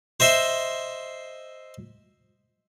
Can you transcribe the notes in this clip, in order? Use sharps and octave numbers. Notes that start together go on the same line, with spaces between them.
C5 D#5 E5 C6